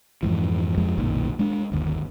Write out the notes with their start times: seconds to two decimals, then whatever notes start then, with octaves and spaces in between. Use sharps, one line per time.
0.23 F2 G#2 E3
0.78 F2 F3 G#3
0.98 F#1 B1 A#2 D#3
1.39 G#3 D4
1.72 G1 D#2